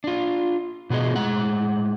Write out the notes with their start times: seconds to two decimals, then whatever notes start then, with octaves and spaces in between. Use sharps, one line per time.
0.04 D4 F4
0.90 B2 B3 F4 G#4 D#5
1.15 A2 G#3 F#5